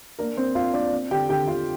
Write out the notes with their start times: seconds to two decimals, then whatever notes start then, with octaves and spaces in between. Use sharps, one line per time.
0.19 A#3 D4 A#4
0.37 C4 D4 C5
0.55 D4 F4 F5
0.74 A#3 D4 D5
0.93 C4
1.11 D3 G4 G5
1.29 D3 G4 G5
1.47 D3 F4 F5